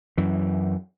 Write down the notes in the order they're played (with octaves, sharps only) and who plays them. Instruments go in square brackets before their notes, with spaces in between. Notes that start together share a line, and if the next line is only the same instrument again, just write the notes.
[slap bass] F#2 E3